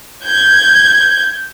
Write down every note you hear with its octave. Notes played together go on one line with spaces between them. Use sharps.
G6 G#6